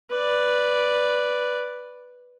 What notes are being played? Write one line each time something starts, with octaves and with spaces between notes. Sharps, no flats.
B4 D5